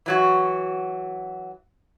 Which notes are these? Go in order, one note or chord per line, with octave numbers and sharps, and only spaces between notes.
E3 F#3 F#4